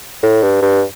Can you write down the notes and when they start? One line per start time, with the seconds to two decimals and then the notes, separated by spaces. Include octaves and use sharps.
0.23 A2
0.43 G2
0.62 G2